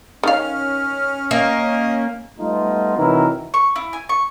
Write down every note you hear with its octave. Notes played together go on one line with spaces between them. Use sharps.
D#3 C#4 F5 F6
A#3 D#5
G3 A3 B3 D#4 F4
C3 D#3 E3 F#3 E4 A#4
C#6
E4
G#5
C#6